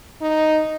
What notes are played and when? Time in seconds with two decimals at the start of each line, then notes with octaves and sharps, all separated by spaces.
0.21 D#4